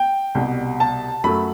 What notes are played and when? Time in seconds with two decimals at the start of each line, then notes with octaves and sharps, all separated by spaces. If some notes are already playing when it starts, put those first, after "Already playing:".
Already playing: G5
0.35 C2 B2 G3
0.80 A5
1.24 F#2 F#3 A3 B5